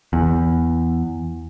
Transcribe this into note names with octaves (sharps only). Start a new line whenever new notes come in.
E2